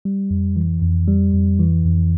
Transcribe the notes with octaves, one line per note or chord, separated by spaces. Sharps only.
G3
F2
E3
F2
G3
F2
E3
F2